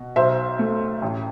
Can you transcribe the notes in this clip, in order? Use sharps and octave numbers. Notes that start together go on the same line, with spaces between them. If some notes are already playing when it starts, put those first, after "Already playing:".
Already playing: B2
B1 C5 E5
A3
A1